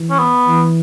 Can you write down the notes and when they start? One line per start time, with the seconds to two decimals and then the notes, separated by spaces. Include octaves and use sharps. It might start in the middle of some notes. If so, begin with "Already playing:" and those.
Already playing: E3
0.10 C#4
0.19 B3
0.48 E3